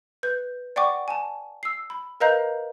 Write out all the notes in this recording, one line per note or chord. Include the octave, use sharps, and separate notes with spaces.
B4 G6
D5 F#5 G5 C#6 D6
G#5 A5
E6 C7
B5
A#4 B4 D#5 F5 A#5 G6